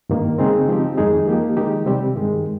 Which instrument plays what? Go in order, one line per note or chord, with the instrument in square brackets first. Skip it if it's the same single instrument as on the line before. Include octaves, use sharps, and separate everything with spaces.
[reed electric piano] G2 D#3 A#3
C#3 G#3 C4 D#4 G#4
F3 C4 D#4 G4
F2 D#3 G#3 D#4 G#4
F3 A#3 D#4 G4
D#3 G#3 D#4 G4
C3 G3 C4 G4
G2 D#3 G#3